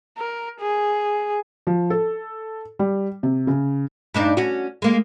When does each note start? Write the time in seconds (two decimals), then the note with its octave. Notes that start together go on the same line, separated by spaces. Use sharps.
0.18 A#4
0.60 G#4
1.67 F3
1.90 A4
2.79 G3
3.23 C3
3.47 C#3
4.14 G2 D4 D#4
4.37 C#4 F#4
4.82 G#3 A#3